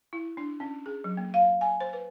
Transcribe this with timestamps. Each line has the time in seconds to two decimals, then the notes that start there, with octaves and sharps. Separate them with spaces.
0.13 E4
0.37 D4
0.60 C#4
0.86 G#4
1.04 F#3
1.17 A#3
1.34 F5
1.61 G#5
1.81 C5
1.93 B4